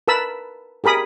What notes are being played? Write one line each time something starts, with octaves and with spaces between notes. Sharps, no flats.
A#4 B4 A5 B5 E6
G4 G#4 A#4 B5 D#6